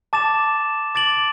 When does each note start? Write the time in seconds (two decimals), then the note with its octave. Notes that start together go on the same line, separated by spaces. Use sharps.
0.13 A5 D6 A6 E7
0.95 D6 A6 D7 F#7